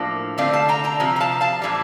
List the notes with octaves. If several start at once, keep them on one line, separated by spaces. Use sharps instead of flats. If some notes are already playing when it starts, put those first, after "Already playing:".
Already playing: A2 F3 A#3 D4
D3 A3 C4 D5 F5
F5 A5
G5 A#5
G5 A#5
C3 F3
A#5
F5 A5
F5 A5
A2 E3 G3